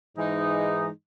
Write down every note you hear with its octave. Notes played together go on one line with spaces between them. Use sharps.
G#2 E3 G#3 D#4